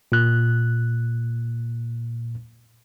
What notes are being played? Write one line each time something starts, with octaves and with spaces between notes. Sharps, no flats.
A#2 F#6